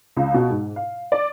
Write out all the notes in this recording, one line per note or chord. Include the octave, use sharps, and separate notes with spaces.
C#2
B2
G#2
F5
D5